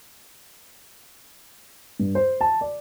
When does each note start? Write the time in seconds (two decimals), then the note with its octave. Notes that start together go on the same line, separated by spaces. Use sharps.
1.99 G2
2.15 C5
2.41 A5
2.61 D5